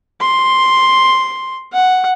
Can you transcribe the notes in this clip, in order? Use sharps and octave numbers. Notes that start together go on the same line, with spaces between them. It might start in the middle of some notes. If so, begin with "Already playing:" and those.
C6
F#5